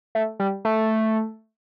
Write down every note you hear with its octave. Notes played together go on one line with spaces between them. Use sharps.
A3
G3
A3